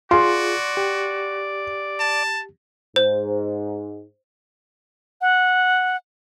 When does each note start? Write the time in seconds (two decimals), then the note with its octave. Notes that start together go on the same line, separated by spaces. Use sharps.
0.11 F4 F#4 G#4 D5 C6
0.77 G4
2.00 A5
2.96 G#2 C5
5.21 F#5